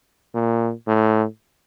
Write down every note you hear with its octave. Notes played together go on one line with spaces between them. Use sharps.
A#2
A2